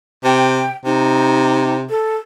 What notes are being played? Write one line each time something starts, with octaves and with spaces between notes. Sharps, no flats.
C3 G5
C3 D#4
A4